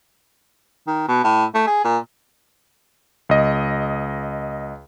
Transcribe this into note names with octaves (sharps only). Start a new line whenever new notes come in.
D#3
B2
A2
A3
G#4
A#2
C#2 D#5